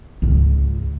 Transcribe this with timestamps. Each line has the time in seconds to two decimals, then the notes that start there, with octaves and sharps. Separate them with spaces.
0.22 C#2 G#2